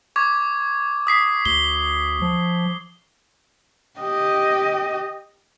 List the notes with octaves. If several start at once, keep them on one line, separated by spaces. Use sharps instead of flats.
C#6 D6 G#6
D#6 B6 C7
D2 G7
F3
G4 D#5